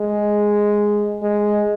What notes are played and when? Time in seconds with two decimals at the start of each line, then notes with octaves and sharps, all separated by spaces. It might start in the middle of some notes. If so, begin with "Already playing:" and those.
Already playing: G#3
1.23 G#3